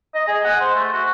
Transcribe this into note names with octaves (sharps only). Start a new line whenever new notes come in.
D#5
G#4
F#5
C5
A3
F#4